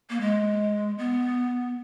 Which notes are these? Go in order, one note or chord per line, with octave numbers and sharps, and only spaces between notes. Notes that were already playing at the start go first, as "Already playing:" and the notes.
A#3
G#3
B3